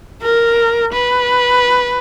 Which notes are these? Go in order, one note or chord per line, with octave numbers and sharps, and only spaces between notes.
A#4
B4